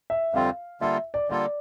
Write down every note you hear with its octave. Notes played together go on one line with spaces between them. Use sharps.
E5
F2 D3 G3 C4 F4 F5
D3 G3 A#3 F4 A4 E5
D5
D3 G3 A#3 F4 A4 D5